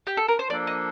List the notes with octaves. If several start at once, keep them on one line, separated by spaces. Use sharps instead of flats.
G4
A4
A#4
C5
F3 A#3 D4 A4 D5
D#5